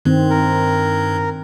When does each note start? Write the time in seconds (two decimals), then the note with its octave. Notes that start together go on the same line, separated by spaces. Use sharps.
0.05 G2 D#3 C4
0.30 A#4